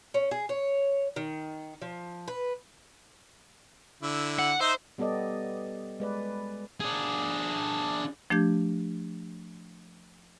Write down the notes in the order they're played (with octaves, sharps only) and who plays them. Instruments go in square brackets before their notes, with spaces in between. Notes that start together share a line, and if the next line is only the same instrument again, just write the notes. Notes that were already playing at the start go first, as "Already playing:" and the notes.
[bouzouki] C#4
G#4
C#5
D#3
F3
B4
[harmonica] D3 E4
[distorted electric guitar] F#5
[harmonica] D#4 E5 [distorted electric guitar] C5
[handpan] G3 B3 G4 A4 D5 D#5
G#3 B4 D5
[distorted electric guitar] D4 G#4
[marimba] F3 A3 D4 G4 G6 G#6